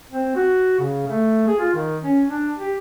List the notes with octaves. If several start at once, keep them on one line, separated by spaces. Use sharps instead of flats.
C4
F#4
C#3
A3
G#4
F4
D#3
C#4
D4
G4